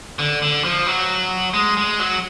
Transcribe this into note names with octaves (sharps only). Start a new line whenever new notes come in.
D3
D3
F3
F#3
G#3
G#3
F#3